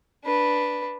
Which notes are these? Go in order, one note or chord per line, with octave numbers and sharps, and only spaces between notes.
D4 B4